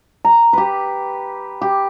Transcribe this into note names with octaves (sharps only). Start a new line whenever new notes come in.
A#5
G4 B4
G4